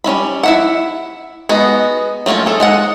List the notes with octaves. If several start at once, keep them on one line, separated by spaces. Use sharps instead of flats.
G3 C#4 E4 B5
E4 E5 F#5
G#3 B3 D#4 F#4
F#3 A3 A#3 C#4 F4
G#4 A4
G#3 D#4 F#5